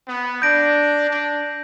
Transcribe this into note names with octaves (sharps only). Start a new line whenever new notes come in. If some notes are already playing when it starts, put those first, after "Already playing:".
B3
D4 G6 A#6 D7
D4